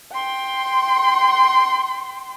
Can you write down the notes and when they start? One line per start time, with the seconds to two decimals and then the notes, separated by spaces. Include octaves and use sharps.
0.13 G5 C6